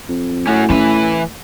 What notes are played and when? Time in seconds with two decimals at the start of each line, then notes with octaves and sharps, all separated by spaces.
0.08 F2
0.47 A2 C#4 F#4
0.70 E3 C#4 B4